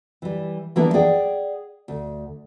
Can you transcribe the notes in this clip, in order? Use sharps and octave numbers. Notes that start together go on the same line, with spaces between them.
E3 G3
E3 G3 A#3 B3 D4 E4
G#4 D5 F#5 G5
D2